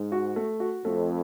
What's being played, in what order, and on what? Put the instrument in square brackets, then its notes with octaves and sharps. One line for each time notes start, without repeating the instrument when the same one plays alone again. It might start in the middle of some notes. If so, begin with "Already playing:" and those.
Already playing: [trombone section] G#2
[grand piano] F#4
A3
F#4
[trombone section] F2 [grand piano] A3